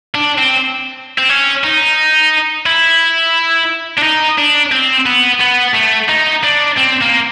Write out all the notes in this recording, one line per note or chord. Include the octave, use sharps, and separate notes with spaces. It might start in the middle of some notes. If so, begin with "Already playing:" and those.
D4
C4
C4
C#4
D#4
E4
D4
D#4
D4
C4
B3
B3
A3
D#4
D4
C4
A#3